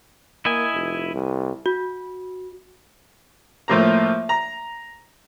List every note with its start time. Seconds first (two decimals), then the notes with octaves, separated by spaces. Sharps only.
0.45 A#3 E4 D#5 G#5
0.74 F1
1.13 C2
1.66 F#4
3.68 A2 F3 A#3 A#5
4.29 A#5